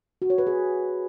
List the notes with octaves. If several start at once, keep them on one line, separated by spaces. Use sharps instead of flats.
F#4
C#5
B4
G#4